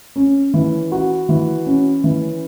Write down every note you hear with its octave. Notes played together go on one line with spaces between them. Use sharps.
C#4
E3
F#4
E3
C#4
E3